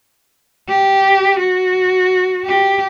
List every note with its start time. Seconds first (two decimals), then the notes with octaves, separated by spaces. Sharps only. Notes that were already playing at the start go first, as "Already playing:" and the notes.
0.69 G4
1.40 F#4
2.45 G4